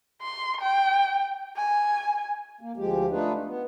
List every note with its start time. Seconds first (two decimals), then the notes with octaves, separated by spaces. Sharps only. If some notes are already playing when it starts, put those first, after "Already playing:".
0.22 C6
0.61 G5
1.57 G#5
2.61 A#3
2.77 D2 F3 G#3 G4
3.11 A3 D4 D#4 F4 B4
3.46 B3